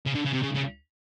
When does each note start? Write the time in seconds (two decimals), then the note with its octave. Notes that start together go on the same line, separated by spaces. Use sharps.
0.06 C#3
0.15 D3
0.26 C#3
0.34 C3
0.43 C#3
0.56 C#3